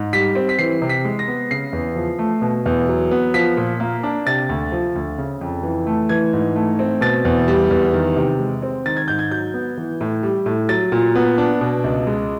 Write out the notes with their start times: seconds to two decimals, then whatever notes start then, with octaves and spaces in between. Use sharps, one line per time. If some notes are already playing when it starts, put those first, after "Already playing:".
Already playing: G#2
0.13 G3 B6
0.35 C4
0.49 B6
0.59 E3 C7
0.82 C3
0.90 B6
1.05 G#3
1.19 A#6
1.28 B3
1.51 C#3 C7
1.73 E2
1.96 F3
2.19 A3
2.42 B2
2.66 E2
2.89 F#3
3.11 B3
3.34 F3 B6
3.57 A#2
3.80 A#3
4.03 D4
4.26 C3 A6
4.49 D2
4.72 F3
4.96 D2
5.18 C#3
5.41 F2
5.63 E3
5.87 A3
6.09 E3 G#6
6.33 G#2
6.56 A3
6.79 C4
7.01 B2 A6
7.25 E2
7.48 G3
7.71 E2
7.94 D#3
8.16 C3
8.39 G#3
8.62 C4
8.86 D#3 A6
8.97 G#6
9.08 G#2 G6
9.19 G#6
9.31 F#3 G6
9.54 B3
9.78 E3
10.01 A2
10.23 G3
10.46 A2
10.69 F#3 A6
10.92 A#2
11.15 B3
11.38 D4
11.61 B2
11.84 C#2
12.07 G#3